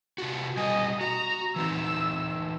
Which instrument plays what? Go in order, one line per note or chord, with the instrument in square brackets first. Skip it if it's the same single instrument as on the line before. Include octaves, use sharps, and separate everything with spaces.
[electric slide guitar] C3 F4 F#4
[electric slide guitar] B2 G3 G#5 [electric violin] D#5
[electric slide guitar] F#4 [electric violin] A#5
[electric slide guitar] E3 C4 D#4 [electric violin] E6